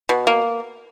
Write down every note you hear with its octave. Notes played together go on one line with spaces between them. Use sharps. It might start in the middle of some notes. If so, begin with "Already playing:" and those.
B2
A#3